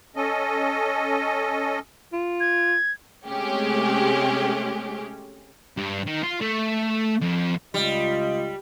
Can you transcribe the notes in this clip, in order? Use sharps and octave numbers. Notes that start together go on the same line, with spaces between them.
C#4 A4 D#5
F4
G#6
C3 G#3 A3 C#4 G4 G#4
G2
D#3
F4
A3
F2
C#2 G3 F4 D#5